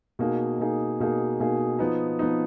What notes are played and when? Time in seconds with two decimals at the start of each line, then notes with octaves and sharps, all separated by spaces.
0.19 B2 A#3 D#4 G#4
0.60 B2 A#3 D#4 G#4
1.00 B2 A#3 D#4 G#4
1.40 B2 A#3 D#4 G#4
1.79 F3 B3 D#4
2.19 F3 B3 D#4